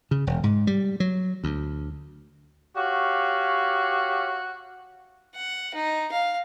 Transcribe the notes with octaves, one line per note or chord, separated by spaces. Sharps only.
C#3
E1
G#2
G3
F#3
D2
F#4 G4 C#5 F5
F#5
D#4
F5